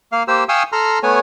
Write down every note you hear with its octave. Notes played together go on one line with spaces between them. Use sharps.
A#3 F5
A#3 G4 C5 E6
F5 G5 G#5 C#6 D#6 E6
A4 A#5 C6 F6
A3 B3 C#5 G#5